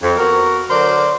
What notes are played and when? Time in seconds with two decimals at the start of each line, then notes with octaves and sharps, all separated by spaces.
0.02 F2
0.17 B3 F#4 A#4
0.69 D3 F#3 A#4 C5 D5